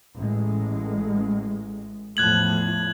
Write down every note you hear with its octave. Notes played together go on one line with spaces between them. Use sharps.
A1 G#3
E2 A2 F3 F#6 G#6 F#7